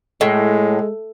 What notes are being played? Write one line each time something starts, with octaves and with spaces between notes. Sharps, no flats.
A2 G#3